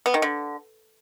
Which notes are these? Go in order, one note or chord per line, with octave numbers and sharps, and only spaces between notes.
B3
D#3
D3